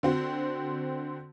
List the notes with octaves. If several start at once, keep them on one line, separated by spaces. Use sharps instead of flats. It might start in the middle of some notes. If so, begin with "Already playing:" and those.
D3 C4 F#4